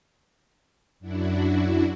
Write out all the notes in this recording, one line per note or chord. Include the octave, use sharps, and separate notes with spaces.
F#2 D4 E4 F#4